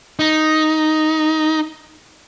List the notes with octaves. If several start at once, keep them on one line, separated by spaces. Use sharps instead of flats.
D#4